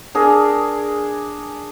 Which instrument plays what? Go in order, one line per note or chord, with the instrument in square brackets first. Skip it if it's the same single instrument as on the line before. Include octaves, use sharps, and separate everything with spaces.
[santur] D4 G#4 A#4